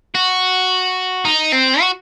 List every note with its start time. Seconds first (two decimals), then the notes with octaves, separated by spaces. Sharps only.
0.15 F#4
1.25 D#4
1.52 C4
1.80 F#4